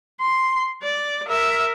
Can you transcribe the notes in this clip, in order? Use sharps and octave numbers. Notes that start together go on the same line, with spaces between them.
C6
D5
A#4 E5